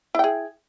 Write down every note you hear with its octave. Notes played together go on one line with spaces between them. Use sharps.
E4 G#4 G5